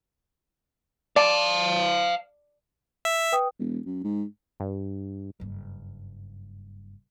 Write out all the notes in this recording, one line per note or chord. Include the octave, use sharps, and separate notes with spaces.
D5 F5 A5
E5
B4 G5 D#6
E1
F#2
G#2
G2
F#1 G2